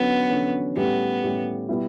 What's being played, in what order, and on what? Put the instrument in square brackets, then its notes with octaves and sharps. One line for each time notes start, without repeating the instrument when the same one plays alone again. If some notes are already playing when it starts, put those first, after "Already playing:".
Already playing: [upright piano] D3 F#3 C#4 [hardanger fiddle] B3
[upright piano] D3 F#3 C#4
[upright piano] A2 G3 C#4 G4 [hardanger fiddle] B3
[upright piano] A2 G3 C#4 G4
B2 G3 B3 E4